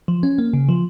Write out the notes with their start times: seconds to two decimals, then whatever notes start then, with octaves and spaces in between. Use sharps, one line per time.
0.08 F3
0.23 C#4
0.38 A#3
0.54 C#3
0.69 F3